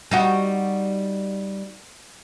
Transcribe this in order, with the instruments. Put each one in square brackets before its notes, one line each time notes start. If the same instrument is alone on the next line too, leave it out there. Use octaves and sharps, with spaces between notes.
[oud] G3 D#4 F#4